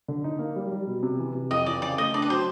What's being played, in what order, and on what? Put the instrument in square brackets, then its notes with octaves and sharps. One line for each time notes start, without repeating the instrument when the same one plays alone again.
[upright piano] D3
D#4
A#3
G3
G3
B2
C3
E3
C3
[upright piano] F2 [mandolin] D#5
[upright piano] E3 [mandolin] D5
[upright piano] C#3 [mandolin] D5
[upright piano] A3 [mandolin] D#5
[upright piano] D4 [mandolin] D5
[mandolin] B4
[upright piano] F#3 [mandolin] C5